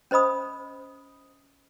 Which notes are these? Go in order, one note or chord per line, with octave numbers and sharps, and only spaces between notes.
C#4 C5 D#5 B5 D#6